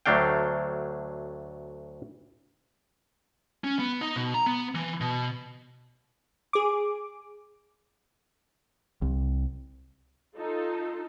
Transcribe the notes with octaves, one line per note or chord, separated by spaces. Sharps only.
D2 F#3 A3 D4 F5 G5
C#4
B3
D#4
B2
A#5
B3
E3
B2
G#4 D6
C2
D#4 F4 A4